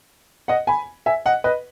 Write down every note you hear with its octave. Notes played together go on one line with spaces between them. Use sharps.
D#5 F#5
G#5 B5
E5 G#5
D#5 F#5
B4 D#5